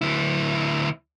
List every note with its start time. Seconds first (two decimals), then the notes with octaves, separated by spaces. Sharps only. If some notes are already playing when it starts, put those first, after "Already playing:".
0.01 D2 E4